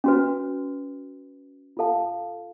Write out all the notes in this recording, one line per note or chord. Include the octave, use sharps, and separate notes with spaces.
C#4 F#4 B4
F4 A4 F5 A5